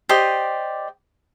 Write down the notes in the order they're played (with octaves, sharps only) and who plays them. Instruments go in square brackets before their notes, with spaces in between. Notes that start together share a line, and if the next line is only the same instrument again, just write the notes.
[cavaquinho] G4 C5 D5 D#5